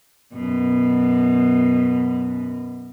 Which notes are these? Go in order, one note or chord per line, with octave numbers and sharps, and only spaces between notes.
F#2 B2